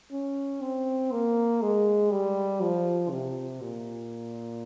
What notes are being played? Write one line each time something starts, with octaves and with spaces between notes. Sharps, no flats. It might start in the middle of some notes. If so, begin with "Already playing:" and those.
C#4
C4
A#3
G#3
G3
F3
C3
A#2